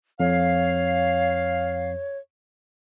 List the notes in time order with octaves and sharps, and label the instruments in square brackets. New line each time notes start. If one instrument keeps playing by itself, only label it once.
[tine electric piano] F2 [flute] C#5 [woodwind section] F5